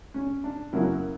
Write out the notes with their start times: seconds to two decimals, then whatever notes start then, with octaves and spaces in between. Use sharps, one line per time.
0.14 C#4
0.44 D4
0.73 F#2 C#3 F#3 A#3 C#4 E4